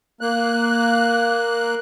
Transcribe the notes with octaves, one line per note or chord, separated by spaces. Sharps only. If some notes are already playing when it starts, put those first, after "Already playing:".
A#3 F#6